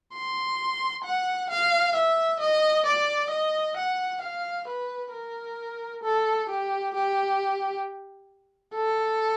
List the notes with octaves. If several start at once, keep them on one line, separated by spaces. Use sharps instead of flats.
C6
F#5
F5
E5
D#5
D5
D#5
F#5
F5
B4
A#4
A4
G4
G4
A4